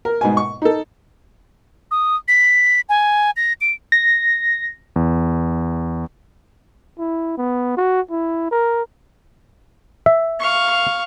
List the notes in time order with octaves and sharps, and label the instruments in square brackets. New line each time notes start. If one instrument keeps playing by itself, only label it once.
[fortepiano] A#4
G#2 B2 G#5
C#6
D#4 A4
[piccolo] D#6
B6
G#5
A#6
D7
[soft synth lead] A#6
[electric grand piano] E2
[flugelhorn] E4
B3
F#4
E4
A#4
[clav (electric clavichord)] E5
[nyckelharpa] F5 C#6